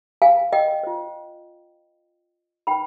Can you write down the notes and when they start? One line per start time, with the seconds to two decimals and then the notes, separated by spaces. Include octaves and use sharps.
0.22 F5 G#5
0.53 D#5 G5
0.83 F4 C5
2.67 D#4 B4 G5 B5